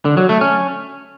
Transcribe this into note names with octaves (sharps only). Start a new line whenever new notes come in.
D3
F#3
A3
C#4